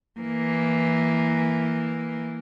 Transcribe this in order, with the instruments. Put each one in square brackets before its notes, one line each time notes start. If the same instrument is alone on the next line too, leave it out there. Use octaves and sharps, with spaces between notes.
[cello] E3 A#3